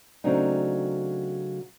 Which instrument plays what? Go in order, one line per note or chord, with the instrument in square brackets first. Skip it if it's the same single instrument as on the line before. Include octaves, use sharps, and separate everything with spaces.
[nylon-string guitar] C#3 F#3 A3 C4 D4 D#4